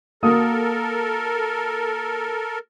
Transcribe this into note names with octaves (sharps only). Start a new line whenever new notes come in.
A#3 F#4 A4 A#4 D#6